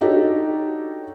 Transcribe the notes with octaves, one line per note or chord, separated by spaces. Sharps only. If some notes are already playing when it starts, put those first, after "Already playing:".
D4 D#4 F#4 G4 A4 C#5